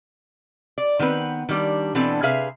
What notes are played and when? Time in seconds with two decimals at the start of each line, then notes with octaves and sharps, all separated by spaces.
0.78 D5
0.99 D#3 B3 C4 B4
1.49 D#3 G3 D4
1.95 B2 E3 B3 C4 D4 A4
2.23 C3 G#4 B4 E5 F5